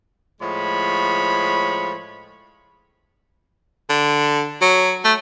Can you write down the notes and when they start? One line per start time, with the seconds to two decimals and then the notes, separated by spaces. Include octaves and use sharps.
0.42 A2 F3 G#3 C#5 B5
3.90 D3
4.61 F#3
5.05 A3